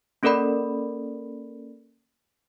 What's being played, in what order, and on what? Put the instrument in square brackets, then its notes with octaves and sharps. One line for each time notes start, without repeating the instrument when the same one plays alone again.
[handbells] A#3 C#4 A4 A#4 D5 B5